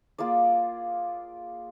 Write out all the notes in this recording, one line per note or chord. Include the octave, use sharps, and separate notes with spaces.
A#3 F4 G#4 D5